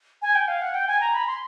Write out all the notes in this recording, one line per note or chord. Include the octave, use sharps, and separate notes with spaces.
G#5
G5
F5
F#5
G5
G#5
A#5
B5
C6